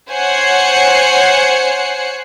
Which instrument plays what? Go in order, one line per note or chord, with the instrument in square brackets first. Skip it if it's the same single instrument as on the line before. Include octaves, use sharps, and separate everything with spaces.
[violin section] C5 C#5 F#5 G#5 C7 C#7